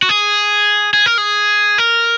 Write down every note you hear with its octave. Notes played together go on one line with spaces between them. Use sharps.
F#4
G#4
G#4
A#4
G#4
A#4